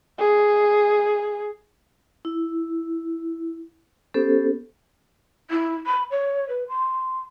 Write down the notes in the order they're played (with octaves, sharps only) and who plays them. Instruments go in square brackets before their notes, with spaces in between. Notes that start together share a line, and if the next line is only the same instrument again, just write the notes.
[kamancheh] G#4
[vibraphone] E4
B3 C#4 G4 A4 C5
[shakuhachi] E4
B5
C#5
B4
C6